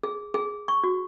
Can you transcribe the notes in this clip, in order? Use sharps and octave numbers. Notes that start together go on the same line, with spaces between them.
G#4
G#4
C#6
F#4